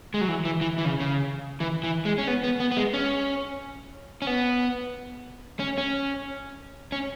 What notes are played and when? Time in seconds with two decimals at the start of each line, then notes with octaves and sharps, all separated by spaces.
0.14 G#3
0.21 F#3
0.28 E3
0.45 E3
0.61 E3
0.78 E3
0.85 C#3
1.00 C#3
1.60 E3
1.84 E3
2.05 G#3
2.18 C#4
2.28 B3
2.44 B3
2.60 B3
2.72 B3
2.77 G#3
2.94 C#4
4.22 C#4
4.27 B3
5.59 C#4
5.78 C#4
6.92 C#4